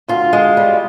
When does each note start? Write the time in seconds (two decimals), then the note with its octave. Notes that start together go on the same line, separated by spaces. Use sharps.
0.08 D2 F4
0.33 G#3
0.57 G3